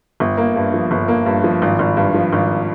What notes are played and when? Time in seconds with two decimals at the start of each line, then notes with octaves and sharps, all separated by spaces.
0.20 G1
0.37 A#3
0.56 G2
0.74 F3
0.91 G1
1.08 A#3
1.26 G2
1.44 F3
1.62 G#1
1.79 G#1
1.97 G2
2.14 F3
2.33 G#1